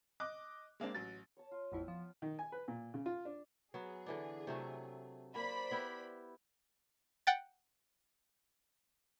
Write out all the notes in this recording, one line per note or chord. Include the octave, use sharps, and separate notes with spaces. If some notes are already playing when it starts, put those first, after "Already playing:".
D#5 D6 F#6
G#3 A#3 C4 D4
A1 F#3 A6
C#5 A5
F4
A1 F2 B3 E4 G5
F3
D#3
G#5
B4
A#2
C#3
F4
D4
F#3 B3 G#4
D3 E3 D4
C3 F#3 A3
A#3 C5 D5 B5
B3 E4 G4
F#5 G5 A6